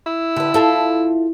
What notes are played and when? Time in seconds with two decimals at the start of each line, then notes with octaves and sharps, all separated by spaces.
0.06 E4
0.36 D3 G4 B4
0.54 A2 F4 A4 E5